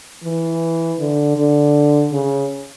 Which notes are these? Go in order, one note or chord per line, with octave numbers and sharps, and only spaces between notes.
E3
D3
D3
C#3